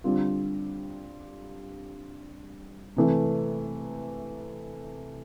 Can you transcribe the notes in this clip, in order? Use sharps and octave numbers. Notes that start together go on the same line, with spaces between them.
D3 G3 C4 F4
C3 E3 A3